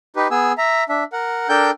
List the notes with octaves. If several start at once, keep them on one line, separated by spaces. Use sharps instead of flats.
D#4 G4 B4
B3 G#4 G#5 E6
E5 A#5
D4 E5
A#4 F#5
D4 A4 A#4 G5 G6